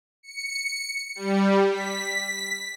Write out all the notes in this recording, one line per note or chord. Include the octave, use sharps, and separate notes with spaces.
C#7
G3
B6